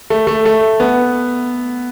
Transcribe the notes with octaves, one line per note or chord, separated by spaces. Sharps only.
A3
A3
A3
B3